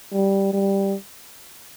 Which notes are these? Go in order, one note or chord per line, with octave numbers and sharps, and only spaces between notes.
G3
G3